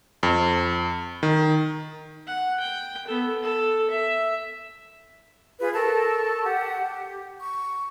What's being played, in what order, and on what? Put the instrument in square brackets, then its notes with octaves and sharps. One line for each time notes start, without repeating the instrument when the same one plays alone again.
[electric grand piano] F2
D#3
[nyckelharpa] F#5
G5
B3 A4
A4
E5
[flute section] F4 G#4 B4
A4 A#4 A5 C#6
G4 F#5
G4
C#6